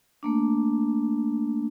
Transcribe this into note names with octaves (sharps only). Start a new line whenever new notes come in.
A3 A#3 D4